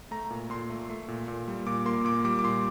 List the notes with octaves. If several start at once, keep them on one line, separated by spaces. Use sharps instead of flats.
A3 A#5
A#2
A#2 C6
A3
A3
A#2
A#2
G3
A#2 D6
A#3 C6
A#2 D6
G3 D6
D6
A#2 C6